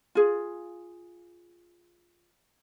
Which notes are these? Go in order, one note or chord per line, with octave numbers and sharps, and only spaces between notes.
F4 G#4